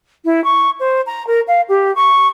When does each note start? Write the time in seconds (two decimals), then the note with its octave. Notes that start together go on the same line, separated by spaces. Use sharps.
0.25 E4
0.44 C#6
0.80 C5
1.06 A#5
1.27 A#4
1.48 F5
1.69 G4
1.95 C#6